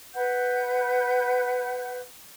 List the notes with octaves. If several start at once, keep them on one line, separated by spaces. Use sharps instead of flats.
B4 F#5 G6